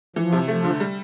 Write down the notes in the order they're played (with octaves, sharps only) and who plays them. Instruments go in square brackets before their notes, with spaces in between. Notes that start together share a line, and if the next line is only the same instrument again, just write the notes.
[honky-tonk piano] E3 [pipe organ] F3
[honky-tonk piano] C3
[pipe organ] F3 [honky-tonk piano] A3
[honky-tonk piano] D3
G3